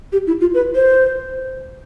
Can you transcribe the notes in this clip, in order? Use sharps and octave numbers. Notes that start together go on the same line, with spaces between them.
G4
E4
F4
B4
C5